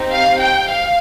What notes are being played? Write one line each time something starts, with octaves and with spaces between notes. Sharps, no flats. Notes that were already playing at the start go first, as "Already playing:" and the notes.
Already playing: C4 D#4 G4
F5
G5
F5